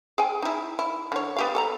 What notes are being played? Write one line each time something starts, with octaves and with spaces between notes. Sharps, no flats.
G#4 G5 G#5
D#4 E4
E4
D3 C#5
B3 G4 F5
A4 G5 A#5